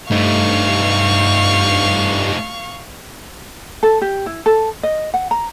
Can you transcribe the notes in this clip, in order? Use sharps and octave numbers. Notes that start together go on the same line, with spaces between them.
G2 A3 D#4 F5 C#6
A4
G4
E4
A4
D#5
F#5
A#5